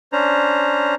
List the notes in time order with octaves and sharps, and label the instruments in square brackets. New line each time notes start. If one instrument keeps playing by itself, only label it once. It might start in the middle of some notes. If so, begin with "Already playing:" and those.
[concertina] C#4 D4 C5 A#5